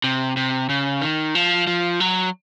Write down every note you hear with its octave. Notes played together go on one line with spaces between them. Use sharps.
C3
C3
C#3
D#3
F3
F3
F#3